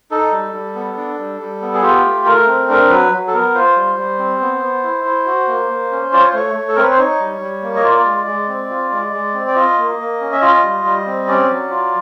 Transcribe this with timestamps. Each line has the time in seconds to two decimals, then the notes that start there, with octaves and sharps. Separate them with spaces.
0.11 D#4 A4
0.33 G3
0.54 G3
0.75 B3
0.97 D4
1.19 G3
1.40 G3
1.62 B3
1.74 G#4
1.83 F4 G4
2.05 A3
2.26 A3 A#4
2.47 C4
2.69 D4 A#4
2.90 F#3 B4
3.12 F#3
3.28 A4
3.34 B3 A#4
3.54 F4 C5
3.76 G3
3.98 G3
4.19 C4
4.41 B3
4.62 B3
4.84 E4
5.05 E4
5.26 F#4
5.48 A#3
5.70 A#3
5.91 C#4
6.13 F4 D5
6.20 C#5
6.28 C5
6.33 A3 C#5
6.55 A3
6.69 A4
6.75 C4 A#4
6.83 B4
6.91 C5
6.98 D#4 C#5
7.20 G3
7.41 G3
7.62 A#3
7.75 D#5
7.84 F4 D5
8.06 G#3
8.27 G#3
8.49 C4
8.70 F4
8.92 G#3
9.13 G#3
9.34 C4
9.48 D5
9.56 F4 D#5
9.78 A#3
9.99 A#3
10.21 C#4
10.33 E5
10.41 F4 D#5
10.63 G3
10.85 G3
11.07 C4
11.28 C#4 D5
11.49 F#3
11.70 F4